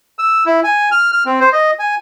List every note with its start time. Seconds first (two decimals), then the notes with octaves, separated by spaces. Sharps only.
0.19 E6
0.46 E4
0.64 G#5
0.92 F6
1.12 F6
1.26 C4
1.40 C5
1.53 D#5
1.79 G#5